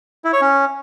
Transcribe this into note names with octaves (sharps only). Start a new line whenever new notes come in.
E4
C#5
C#4